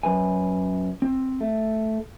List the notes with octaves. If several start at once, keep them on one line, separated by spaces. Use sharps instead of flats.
F#2 B4 G#5
C4
A3